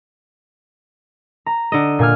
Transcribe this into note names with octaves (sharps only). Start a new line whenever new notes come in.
A#5
D3 D#5
A#2 G#5 F6